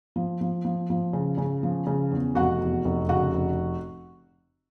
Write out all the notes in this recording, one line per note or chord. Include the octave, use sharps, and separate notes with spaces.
F3
F3
F3
F3
C#3
C#3
F3
C#3
E2
F1 F#4 F#5
E2
F1
C#3 F#4 F#5
F1